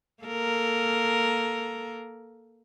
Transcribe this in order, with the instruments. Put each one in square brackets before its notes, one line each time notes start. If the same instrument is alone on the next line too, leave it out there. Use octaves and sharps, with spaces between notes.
[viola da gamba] A#3 A4 A#4